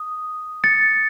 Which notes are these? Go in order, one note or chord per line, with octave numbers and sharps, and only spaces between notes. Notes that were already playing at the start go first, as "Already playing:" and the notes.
Already playing: D#6
A6 C#7